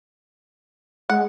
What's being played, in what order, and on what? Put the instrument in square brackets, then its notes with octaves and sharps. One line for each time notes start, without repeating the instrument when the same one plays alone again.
[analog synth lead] G#3 [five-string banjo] F#5